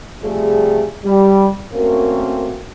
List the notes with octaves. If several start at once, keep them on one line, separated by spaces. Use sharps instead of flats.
C3 F3 G3 A3 G#4
G3
A3 A#3 C4 C#4 F#4 A#4